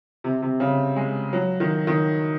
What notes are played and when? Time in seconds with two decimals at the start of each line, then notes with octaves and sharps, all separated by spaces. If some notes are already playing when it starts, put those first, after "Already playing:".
0.24 C3
0.42 C3
0.60 C#3
0.96 G#3
1.33 F#3
1.60 D#3
1.87 D#3